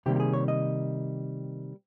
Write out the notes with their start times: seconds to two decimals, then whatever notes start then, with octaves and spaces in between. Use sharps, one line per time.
0.06 C3 D#3 G3 A#3 G4
0.16 G4
0.20 G#4
0.33 C#5
0.48 D#5